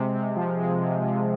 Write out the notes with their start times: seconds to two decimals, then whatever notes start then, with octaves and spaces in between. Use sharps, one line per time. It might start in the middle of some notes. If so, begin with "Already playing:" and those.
Already playing: C3 G#3
0.14 C3
0.36 F3
0.58 G#3
0.80 C3
1.01 C3